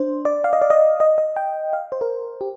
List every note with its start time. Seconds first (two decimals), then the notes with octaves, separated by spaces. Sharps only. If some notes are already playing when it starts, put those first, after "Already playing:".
Already playing: D4 C5
0.25 D5
0.44 F5
0.53 D#5
0.62 D5
0.70 D#5
1.00 D#5
1.18 D#5
1.36 G5
1.73 F5
1.92 C5
2.01 A#4
2.41 G4